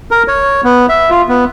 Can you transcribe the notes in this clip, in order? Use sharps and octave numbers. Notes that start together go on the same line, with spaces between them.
A#4
C#5
B3
E5
F4
B3